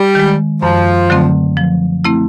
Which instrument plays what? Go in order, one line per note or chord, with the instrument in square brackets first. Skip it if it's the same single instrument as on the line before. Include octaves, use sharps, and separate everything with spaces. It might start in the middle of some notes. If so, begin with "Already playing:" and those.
Already playing: [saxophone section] G3
[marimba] D#3 G#3
[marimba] F#2 [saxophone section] F3
[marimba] D3 F#3 A3 C4
F3
A3 C4 E4